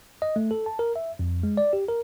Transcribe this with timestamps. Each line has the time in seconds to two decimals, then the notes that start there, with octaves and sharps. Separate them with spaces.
0.22 D#5
0.36 A3
0.51 A4
0.66 A5
0.79 A#4
0.96 E5
1.19 F2
1.43 G#3
1.57 D5
1.73 G4
1.88 A#4